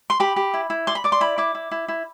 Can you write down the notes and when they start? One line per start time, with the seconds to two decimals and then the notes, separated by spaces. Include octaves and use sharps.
0.10 C6
0.20 G4 B5
0.36 G4
0.54 E4
0.70 E4
0.87 D5 C6
0.95 B5
1.04 D5 D6
1.12 C6
1.21 E4 B5
1.38 E4 D6
1.55 E4
1.71 E4
1.88 E4